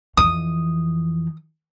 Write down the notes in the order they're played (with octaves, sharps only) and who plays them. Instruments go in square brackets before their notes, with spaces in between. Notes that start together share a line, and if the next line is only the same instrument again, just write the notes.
[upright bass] F2 E3 [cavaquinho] D#6